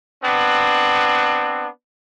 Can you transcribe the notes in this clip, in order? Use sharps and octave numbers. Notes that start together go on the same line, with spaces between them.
B3 C4 D4